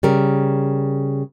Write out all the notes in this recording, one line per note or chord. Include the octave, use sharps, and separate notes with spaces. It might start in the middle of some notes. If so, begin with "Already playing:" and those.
C#3 G3 A#4